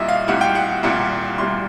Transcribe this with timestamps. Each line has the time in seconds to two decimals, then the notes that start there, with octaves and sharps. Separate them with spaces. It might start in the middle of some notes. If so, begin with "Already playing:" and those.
Already playing: C2 A#2 G3 D#5 E5
0.09 F5
0.28 C2 A#2 G3 F#5
0.41 G5
0.55 F#5
0.83 C2 A#2 G3 F#5
1.38 C2 A#2 G3 C6